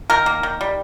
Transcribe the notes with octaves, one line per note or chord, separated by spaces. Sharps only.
D#3 A#4
A#3
D#3
G3